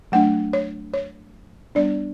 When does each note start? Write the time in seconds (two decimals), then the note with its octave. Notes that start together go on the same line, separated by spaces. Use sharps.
0.12 F#3 A3 D4 F#5
0.53 C#5
0.94 C#5
1.75 G3 B3 D4 D5